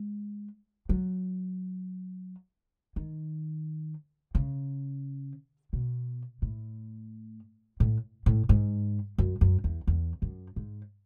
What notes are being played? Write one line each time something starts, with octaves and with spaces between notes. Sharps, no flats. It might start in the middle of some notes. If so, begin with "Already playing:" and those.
Already playing: G#3
F#3
D#3
C#3
B2
A2
A2
A2
G#2
F#2
F#2
E2
E2
F#2
G#2